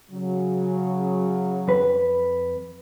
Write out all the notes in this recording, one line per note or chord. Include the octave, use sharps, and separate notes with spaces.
C#3 F#3
F2 B4